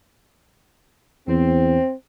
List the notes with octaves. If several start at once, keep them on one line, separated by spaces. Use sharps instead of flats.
E2 C4